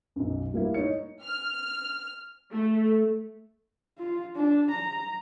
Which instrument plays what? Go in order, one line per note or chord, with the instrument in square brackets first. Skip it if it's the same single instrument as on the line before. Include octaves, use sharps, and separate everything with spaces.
[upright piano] B1 F#2
G3 A#3 E4
D#4 C#5 C#7
[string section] F6
A3
[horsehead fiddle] F4
D4
A#5